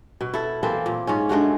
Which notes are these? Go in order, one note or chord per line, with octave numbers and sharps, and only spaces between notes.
B2
E4 A4
E3 A#3 C4 A4
A#2
G#2 C#4
G2 G#3 A3 F#4